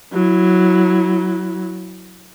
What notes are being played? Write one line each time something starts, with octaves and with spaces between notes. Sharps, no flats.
F#3 E4